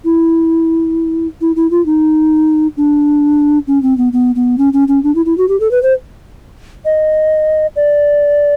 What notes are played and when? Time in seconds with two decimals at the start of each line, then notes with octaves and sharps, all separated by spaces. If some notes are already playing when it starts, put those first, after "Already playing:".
0.05 E4
1.41 E4
1.56 E4
1.71 F4
1.86 D#4
2.77 D4
3.67 C#4
3.83 C4
3.98 B3
4.13 B3
4.35 B3
4.58 C#4
4.73 C#4
4.88 C#4
5.03 D4
5.15 E4
5.26 E4
5.38 F#4
5.48 G4
5.60 A4
5.71 B4
5.83 C5
6.85 D#5
7.76 D5